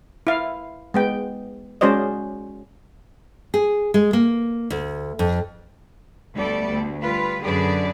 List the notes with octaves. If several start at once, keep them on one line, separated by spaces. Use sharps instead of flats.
E4 F5
G#3 B3 G5
G#3 C#4 F#4 C5 D5 D#5
G#4
G#3
A#3
D2
F2
D2 G3 A3 B3 A4 D5
D2
G3 F4 B4
F#2 D3 G#4 B4 D5